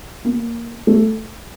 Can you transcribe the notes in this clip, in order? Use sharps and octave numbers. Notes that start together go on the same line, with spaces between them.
A#3
A3